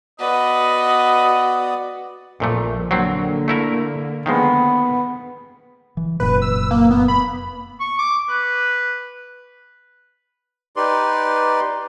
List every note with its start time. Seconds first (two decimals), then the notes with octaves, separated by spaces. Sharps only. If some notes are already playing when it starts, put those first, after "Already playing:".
0.20 B3 F#4 B4 D5 D#5 D#6
2.40 A#1 F2 A#2 F3 A3
2.91 D3 F#3 A#3 C4
3.48 A3 E4 A#4
4.26 D#3 F3 G#3 B3
5.97 E3
6.20 F1 F#2 A#2 B4
6.42 E6
6.71 A#3
6.91 B3
7.08 B5
7.80 C#6
7.98 D6
8.29 B4
10.76 D#4 G4 B4 D5 C6